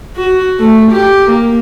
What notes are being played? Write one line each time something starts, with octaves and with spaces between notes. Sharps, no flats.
F#4
A3
G4
A#3